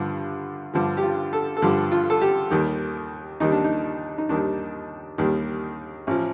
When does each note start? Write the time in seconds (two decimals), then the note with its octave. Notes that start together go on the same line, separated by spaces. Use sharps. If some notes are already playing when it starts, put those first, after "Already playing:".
Already playing: G2 D3 F3
0.74 G2 D3 F3
0.97 G4
1.03 F4
1.33 A4
1.57 A4
1.62 G2 D3 F3 G4
1.92 F4
2.10 A4
2.21 G4
2.51 D#2 D#3 G3
3.40 D#2 D#3 G3 D#4
3.52 D4
3.64 D#4
4.18 D#4
4.29 D#2 D#3 G3 D4
5.18 D#2 D#3 G3
6.07 A1 F3